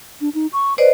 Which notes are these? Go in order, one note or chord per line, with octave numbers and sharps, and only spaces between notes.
D4
D#4
C#6
B4 C5 D5 D#5